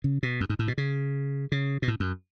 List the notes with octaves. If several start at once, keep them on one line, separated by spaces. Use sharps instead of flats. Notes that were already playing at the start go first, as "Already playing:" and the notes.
C#3
B2
F#2
G#2
A2
B2
C#3
C#3
B2
A2
F#2